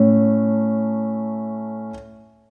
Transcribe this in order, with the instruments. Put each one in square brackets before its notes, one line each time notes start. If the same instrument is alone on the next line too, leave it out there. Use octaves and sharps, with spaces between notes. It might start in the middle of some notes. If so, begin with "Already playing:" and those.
Already playing: [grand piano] A2 A3 C#4